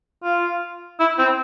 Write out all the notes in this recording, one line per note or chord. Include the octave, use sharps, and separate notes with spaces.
F4
E4
C4